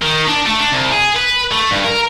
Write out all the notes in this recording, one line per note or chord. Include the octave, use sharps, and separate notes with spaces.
D#3
D4
A3
D4
C2
G#4
B4
A3
G2
A#4